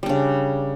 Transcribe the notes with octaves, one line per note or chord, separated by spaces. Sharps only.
C#3 G3 D4